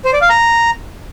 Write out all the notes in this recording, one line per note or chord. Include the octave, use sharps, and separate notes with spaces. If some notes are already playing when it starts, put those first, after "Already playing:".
C5
D5
F5
A#5